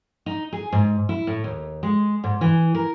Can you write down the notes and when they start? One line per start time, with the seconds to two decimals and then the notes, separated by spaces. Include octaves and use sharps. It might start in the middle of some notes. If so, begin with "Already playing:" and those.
0.26 D#4
0.53 G#4
0.72 G#2
1.09 E4
1.27 A2
1.44 D#2
1.83 G#3
2.24 G#2
2.41 E3
2.74 A#4